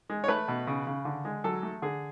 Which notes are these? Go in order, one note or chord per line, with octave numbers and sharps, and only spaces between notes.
G#3
C#5
A3 B4
B2
C#3
C#3
D3
G#3
F#3 A4
A3
D3 G#4